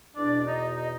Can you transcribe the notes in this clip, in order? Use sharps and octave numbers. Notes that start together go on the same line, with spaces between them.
E2 B2 D4 D5
D5
D#4 D#5
D#4 D#5